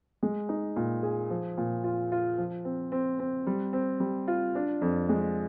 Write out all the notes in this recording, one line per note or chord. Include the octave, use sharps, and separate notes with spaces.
G#3
D#4
A#2
G#4
F3
A#2
F4
F4
F3
C4
C4
C4
G3
C4
G3
F4
D4
F2
G#3